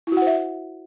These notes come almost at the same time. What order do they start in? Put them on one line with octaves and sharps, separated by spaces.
E4 F#4 F#5 C5 E5